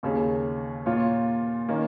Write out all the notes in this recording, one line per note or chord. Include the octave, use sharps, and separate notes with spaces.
D#2 C#3 A#3 C#4
A#2 A#3 F4 C#5
D#3 A#3 C#4